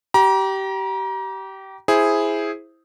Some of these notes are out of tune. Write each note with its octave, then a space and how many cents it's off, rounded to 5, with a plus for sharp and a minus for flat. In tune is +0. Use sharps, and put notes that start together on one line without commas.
G4 -25 A#5 +30
E4 +0 G#4 +0 C5 +0